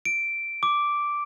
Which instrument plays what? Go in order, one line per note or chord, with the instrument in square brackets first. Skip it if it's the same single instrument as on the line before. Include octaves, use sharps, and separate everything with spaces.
[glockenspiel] D7
D6